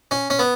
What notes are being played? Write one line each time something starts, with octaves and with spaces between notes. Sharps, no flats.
C#4
C#4
B3